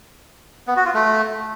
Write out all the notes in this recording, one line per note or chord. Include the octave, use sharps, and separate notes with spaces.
B3
F#4
F4
A3